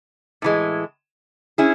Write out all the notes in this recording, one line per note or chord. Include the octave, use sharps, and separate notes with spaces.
A2 E3 G#3
C#4 E4 G#4